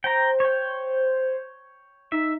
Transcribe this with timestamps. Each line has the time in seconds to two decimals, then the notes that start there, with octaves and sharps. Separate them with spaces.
0.04 C5 G5 A#5
0.40 C#5 G5
2.12 D#4 E5